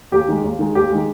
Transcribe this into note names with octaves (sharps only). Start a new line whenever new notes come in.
D#2 G4
D#3 G#3
D#2
D#3 G#3
D#2 G4
D#3 G#3